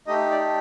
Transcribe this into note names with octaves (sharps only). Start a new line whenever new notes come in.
A3 D#4 G4 D#5
D5